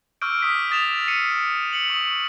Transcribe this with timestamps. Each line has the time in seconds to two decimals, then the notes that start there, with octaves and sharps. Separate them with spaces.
0.21 C#6 D6 E6 F6 G6 D7
0.42 D#6 B6
0.71 D#6 A6 D7 E7 F7
1.08 C7 C#7 D#7
1.73 C#7 F#7
1.90 C#6 D#6